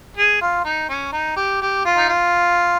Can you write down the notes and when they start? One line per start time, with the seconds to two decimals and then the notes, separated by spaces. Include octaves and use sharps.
0.17 G#4
0.41 F4
0.65 D#4
0.89 C#4
1.13 D#4
1.36 G4
1.61 G4
1.85 F4
1.97 D#4
2.08 F4